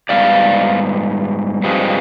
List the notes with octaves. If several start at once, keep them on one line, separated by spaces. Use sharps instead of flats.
G#2 G3 B3 D5 F5
G2 F3 G#3 C4